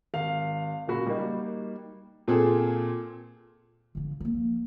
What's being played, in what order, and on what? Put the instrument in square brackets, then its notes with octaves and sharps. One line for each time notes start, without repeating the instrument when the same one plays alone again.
[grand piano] G#1 F5 F7
F#1 A#2 F#4 B5
G3 A#3 D#4
[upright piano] A#2 C4 G#4 A4
[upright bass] D3 F3
F3 A#3